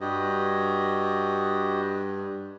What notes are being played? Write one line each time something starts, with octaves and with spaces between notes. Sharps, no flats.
G2 F#4 G4 D#5